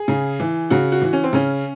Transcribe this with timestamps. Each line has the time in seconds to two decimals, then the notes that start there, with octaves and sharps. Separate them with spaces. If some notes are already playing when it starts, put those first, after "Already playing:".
Already playing: G#4
0.08 C#3
0.40 E3
0.70 C#3 F#4
0.92 F#4
1.02 E3
1.13 C#4
1.24 C4
1.33 C#3 C#4